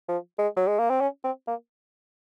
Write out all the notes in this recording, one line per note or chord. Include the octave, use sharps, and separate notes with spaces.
F3
G#3
F#3
G#3
A#3
C4
C#4
C4
A#3